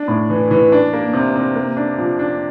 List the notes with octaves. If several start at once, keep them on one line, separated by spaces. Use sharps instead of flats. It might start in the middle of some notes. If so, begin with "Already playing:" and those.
Already playing: D4
A2
E3
E3
D4
A#3
C3
C3
A#3
D4
F3
D4